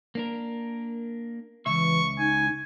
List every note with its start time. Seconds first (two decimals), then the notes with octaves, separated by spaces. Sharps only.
0.15 A#3 D4 A#4
1.66 C#2 E3 E5 C#6
2.19 D#4 G#5